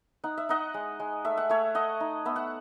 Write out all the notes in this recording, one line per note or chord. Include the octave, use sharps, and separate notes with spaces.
D#4 F#5
E5
D#4 D#5 F#5
G#3
G#3
A3 E5
F#5
A3 C#5 E5
A3 D#5 F#5
D#4
B3 E5
F#5